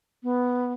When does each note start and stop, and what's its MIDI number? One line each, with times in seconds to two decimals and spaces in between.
0.23 0.73 59